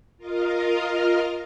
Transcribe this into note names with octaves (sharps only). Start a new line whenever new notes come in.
F4 A#4 D#5 F5